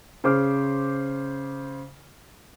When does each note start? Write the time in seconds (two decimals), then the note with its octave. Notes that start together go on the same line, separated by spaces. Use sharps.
0.24 C#3 C5 D6 F6